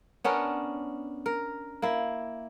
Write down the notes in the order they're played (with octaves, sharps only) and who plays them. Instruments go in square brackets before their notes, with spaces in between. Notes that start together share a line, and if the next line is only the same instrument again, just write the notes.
[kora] B3 C#4 D4 A#4
A#4
A#3 E4